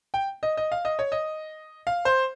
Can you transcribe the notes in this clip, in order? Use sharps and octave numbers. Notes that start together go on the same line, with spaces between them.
G5
D#5
D#5
F5
D#5
C#5
D#5
F5
C5